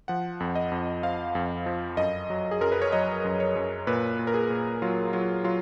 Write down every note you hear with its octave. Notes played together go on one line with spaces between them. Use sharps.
F3 F#5
F2
D#5
F2
F3 F5
F2
F3
F#2 D#5
F#3
G#4
F#2 A#4
B4
C#5
F#3 D#5
F#2
C#5
F#2
A#2 B4
A#2
A#4
G#4
A#2
F#3 F4
F#3 F4
F#3 F4